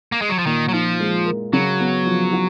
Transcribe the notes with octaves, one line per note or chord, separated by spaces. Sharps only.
A#3
G#3
F#3
F3
A#2 D#3
F#3
F3 D#4
G#3
A#4
C#3 F#3
B3
F3
F#4